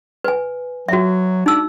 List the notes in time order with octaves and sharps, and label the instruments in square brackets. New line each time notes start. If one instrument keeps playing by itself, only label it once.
[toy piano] B4 G#5
[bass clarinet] F#3 [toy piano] F#4 E5
[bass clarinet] D4 [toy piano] D#4 E6